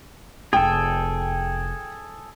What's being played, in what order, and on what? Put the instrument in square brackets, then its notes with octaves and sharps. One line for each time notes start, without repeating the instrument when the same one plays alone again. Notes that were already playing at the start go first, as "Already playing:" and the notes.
[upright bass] F1 [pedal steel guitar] G#4 A4 [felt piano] G5